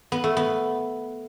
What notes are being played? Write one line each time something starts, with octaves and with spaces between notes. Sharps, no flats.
B3
A3
B3